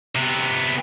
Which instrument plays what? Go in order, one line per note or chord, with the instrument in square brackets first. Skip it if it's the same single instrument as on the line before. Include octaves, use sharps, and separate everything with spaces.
[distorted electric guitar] C3 B3